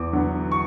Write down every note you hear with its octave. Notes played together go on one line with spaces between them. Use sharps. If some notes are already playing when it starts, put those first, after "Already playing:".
Already playing: E2 D6
D3 F#3 B3
C#6